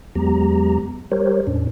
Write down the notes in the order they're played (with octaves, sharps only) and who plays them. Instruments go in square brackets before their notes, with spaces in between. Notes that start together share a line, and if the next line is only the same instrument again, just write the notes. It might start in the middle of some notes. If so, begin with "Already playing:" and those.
[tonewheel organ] E2 F#3 G#3 B3 G4 A#5
G3 G4 A#4 C5 C#5
E2 A2 C#4 D4